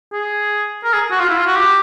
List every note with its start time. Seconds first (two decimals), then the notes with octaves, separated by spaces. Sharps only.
0.12 G#4
0.84 A#4
0.93 G#4
1.11 F#4
1.19 F4
1.29 E4
1.38 F4
1.46 F#4
1.56 G4